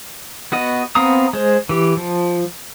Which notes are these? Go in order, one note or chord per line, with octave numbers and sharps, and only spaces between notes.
B3 F#4 D#5
B3 C4 F5 A#5 D#6
G#3 C5
E3 G4
F3